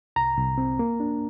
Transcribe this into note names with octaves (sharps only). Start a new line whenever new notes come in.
C2 A#5
C2
C4
A#3
D4